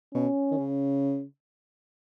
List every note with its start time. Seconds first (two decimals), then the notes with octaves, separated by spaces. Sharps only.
0.14 B2 C#4
0.51 D#3
0.58 C#3